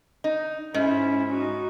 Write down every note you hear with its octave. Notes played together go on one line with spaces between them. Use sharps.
D#4
G#2 C#4 E4
D#4 F#4